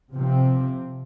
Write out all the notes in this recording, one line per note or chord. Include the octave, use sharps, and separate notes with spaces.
C3 F3 C4